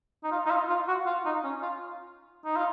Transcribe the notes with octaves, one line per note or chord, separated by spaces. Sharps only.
D#4
F4
D#4
F4
F4
F#4
F4
D#4
C#4
F4
D#4
F4